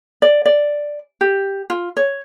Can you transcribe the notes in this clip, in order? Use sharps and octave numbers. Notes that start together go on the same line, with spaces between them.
D5
D5
G4
F4
C#5